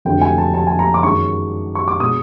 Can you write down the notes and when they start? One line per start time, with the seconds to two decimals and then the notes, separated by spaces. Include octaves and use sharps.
0.05 F1 F2 D3 F#3 A3 G5
0.22 G#5
0.38 A5
0.54 A5
0.67 G#5
0.79 A#5
0.94 D6
1.03 F#2 D#3 G#3 C#6
1.75 C#6
1.88 D6
2.00 B2 G#3 D#6